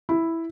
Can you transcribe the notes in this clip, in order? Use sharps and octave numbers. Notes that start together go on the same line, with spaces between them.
E4